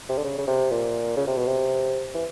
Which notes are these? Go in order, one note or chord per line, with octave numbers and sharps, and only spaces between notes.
C3
D3
C#3
C#3
C3
A#2
C#3
C3
B2
C3
E3